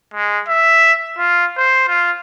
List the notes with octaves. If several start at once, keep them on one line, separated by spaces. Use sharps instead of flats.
G#3
E5
F4
C5
F4